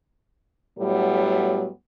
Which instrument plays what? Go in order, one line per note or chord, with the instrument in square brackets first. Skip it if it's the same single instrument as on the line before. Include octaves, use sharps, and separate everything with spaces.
[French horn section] A2 F#3 G3 B3 A4